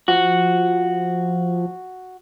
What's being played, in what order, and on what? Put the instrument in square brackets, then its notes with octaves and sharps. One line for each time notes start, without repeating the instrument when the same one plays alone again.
[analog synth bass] F3 [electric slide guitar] F#4